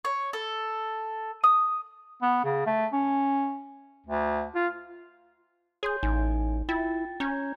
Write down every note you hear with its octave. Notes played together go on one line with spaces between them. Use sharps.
C#5
A4
D#6
B3
C#3
A3
C#4
D2
F4
G#4 C#5 C6 G6
A1 D#4 G#5
E4 F4 G5 A6
C#4 A#5 G6 G#6